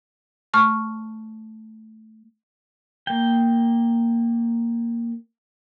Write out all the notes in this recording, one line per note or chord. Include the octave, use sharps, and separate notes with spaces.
A3 C#6 F6
A#3 G5